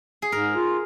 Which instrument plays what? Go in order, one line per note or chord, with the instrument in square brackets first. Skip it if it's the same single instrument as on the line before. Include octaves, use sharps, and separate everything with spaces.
[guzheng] G#4
[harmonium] G#2 [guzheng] A#4
[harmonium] F4